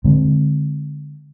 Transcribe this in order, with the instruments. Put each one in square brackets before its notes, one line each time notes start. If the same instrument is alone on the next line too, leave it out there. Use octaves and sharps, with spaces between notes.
[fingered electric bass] D3 G#3 C4